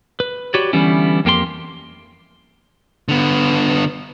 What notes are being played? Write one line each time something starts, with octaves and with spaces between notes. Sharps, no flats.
B4
F#4 G4 B4 C#5 D5
D3 E3 G3 B3 C#4 E4
F2 A#3 G4 A4 C6
D3 B3